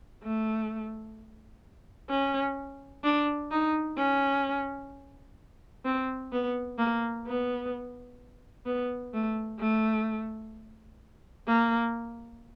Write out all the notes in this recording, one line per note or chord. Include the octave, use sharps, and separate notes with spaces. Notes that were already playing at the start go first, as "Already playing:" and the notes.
A3
C#4
D4
D#4
C#4
C4
B3
A#3
B3
B3
A3
A3
A#3